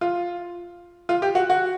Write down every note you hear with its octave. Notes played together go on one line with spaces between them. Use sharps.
F4
F4
G4
F#4
F#4